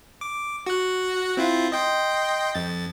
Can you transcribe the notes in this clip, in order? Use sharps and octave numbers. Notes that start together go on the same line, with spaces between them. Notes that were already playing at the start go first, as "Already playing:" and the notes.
D6
F#4 F#6
C4 E4 F4
D#5 G5 C6
F2 A6